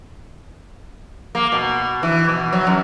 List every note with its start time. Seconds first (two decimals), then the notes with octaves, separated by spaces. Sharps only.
1.35 A#3
1.52 B2
2.03 E3
2.29 B2
2.53 F#3
2.67 F#2